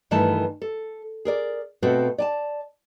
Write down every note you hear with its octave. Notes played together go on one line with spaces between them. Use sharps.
G2 D#3 E3 A3 A5
A4
G#4 A#4 D5
B2 A3 C4 F#4 A4
D5 G#5 A5